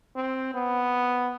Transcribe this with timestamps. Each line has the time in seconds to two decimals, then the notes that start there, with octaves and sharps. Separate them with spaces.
0.16 C4
0.54 B3